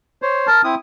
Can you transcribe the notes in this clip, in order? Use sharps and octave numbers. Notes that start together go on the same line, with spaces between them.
C5 C#5
A#4 A5
C4 E4 D#6